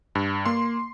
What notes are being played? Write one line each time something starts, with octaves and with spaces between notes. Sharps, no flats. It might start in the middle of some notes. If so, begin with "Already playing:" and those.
G2
A#3 C6